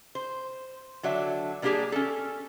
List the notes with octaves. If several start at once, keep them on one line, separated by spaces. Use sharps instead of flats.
C5
D3 F#3 D4 E5
G3 A#3 D4 F4 G4 G#4
C#4 A4